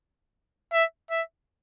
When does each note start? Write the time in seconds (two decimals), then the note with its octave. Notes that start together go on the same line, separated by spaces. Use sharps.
0.73 E5
1.10 E5